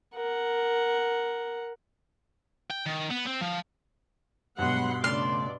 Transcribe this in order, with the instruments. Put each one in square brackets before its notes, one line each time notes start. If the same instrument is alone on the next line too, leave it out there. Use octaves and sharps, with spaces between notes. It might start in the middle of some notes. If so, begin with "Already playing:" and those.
[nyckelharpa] A#4 F#5
[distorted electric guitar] G5
D#3
B3
C4
F3
[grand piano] G2 B2 [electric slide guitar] F#3 G#3 B3 [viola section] F#5 B5 C6
[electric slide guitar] C#3 A3 [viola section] D4 D5 [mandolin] C6 F6